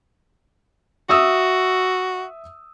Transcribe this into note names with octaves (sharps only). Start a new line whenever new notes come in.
F#4 E5 D#6 E6